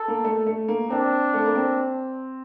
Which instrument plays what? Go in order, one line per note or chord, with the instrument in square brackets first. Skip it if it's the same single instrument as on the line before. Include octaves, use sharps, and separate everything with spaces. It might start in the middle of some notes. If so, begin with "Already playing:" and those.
Already playing: [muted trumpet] A4
[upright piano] A#3
A3
A3
A#3
[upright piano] C4 [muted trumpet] D4
[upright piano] A3
A#3
C4